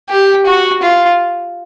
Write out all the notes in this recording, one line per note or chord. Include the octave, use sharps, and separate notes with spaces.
G4
F#4
F4